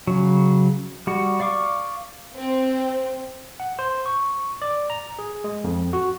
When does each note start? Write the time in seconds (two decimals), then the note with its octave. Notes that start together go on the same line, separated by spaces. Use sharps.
0.07 C#3 F#3
1.07 G3 F#4
1.40 D5 F5 C#6 D6
2.37 C4
3.60 F#5
3.79 C5
4.06 C#6
4.62 D5
4.90 A#5
5.19 G#4
5.44 G#3
5.64 F2
5.93 F#4